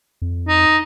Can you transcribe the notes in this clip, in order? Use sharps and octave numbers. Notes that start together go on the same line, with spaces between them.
F2
D#4